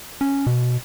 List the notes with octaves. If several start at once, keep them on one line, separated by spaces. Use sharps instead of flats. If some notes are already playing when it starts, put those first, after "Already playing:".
C#4
B2